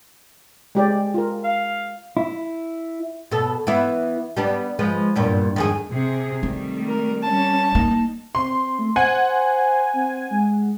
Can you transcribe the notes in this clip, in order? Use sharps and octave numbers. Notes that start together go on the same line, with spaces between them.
G#3 G4 D5
F4 A#4
F5
E4
B2 A4
E3 B3 E4
G3 B3 D4
F3 G#3 B4
E2 G2 A#2
F2 D#3 G#4
C3 G#4
D#3 G3 A3 C4
A#4
G3 C#4 A5
A#3 D#4
C4 C6
A3
C5 F#5 G#5
C4
G#3